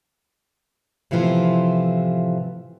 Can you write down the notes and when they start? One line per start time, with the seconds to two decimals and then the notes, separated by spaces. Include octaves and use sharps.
1.11 A2 C3 E3 F3 B3